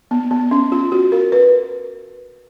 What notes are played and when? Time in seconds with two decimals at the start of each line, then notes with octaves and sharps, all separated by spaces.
0.11 B3
0.31 B3
0.51 C#4
0.72 F4
0.92 F#4
1.12 A#4
1.32 B4